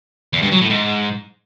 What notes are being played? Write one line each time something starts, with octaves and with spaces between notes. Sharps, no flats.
E2
G2
F#3
A2
G#2